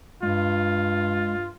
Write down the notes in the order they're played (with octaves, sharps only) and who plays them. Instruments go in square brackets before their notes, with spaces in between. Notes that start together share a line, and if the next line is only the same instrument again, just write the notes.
[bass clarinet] G2 [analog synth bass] G#3 [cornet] F4